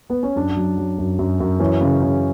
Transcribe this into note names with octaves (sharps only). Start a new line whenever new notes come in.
B3
C#4
F#2 D4
F#3
F#3
F#2
F#2
F#2
E3 C#4
C#3
C#3